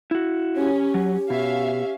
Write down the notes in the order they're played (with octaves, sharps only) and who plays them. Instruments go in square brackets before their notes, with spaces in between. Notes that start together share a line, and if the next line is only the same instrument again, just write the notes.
[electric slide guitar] E4 F#4
[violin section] C#4 [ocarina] G4
[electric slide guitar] F#3
[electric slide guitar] B2 [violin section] C#4 E5 F5